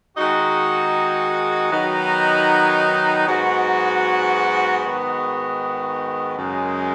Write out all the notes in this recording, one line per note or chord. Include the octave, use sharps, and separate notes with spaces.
D#3 G#3 D#4 F#4
D#3 F#3 B3 D#4
G#2 F#3 B3 F#4
G#2 D#3 B3 F#4
F#2 C#3 G#3